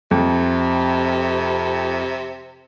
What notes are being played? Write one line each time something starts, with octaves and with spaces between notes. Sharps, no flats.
F2 C3